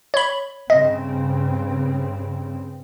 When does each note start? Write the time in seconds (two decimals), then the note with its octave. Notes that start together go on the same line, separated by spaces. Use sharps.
0.14 C#5 B5
0.70 G2 C#3 C4 D#5